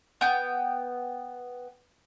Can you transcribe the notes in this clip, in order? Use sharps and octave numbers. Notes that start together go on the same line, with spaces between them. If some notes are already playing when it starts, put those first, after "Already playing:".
B3 G5